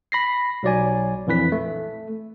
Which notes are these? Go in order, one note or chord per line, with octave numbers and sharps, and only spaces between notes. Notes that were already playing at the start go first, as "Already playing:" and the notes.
B5 A#6 C7
B1 F#3 D5 G#5
A#1 F2 E3 B4 B6
A3